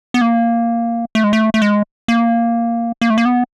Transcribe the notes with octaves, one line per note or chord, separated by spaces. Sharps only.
B3
A#3
A3
G#3
A3
A3
G#3
A#3
A#3
A3
A#3
B3